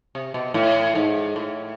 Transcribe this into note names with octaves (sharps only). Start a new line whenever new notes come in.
C3
B2
A2
G#2
A2